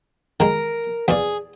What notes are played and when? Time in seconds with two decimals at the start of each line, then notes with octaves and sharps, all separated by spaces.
0.40 D#3 G#3 A#4
1.08 E2 A#2 G#4 D5